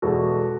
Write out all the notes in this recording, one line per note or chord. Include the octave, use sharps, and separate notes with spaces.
E2 B2 G#3 F#4 A4